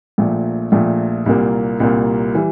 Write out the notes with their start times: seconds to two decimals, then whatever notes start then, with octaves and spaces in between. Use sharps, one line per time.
0.18 A#1 A#2 A3
0.72 A#1 A#2 A3
1.26 C2 A#2 G3 A#3
1.80 C2 A#2 G3 A#3
2.35 E3 G3